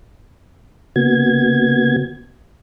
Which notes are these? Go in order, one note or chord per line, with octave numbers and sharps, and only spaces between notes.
C#3 A#3 B3 F#4 G#6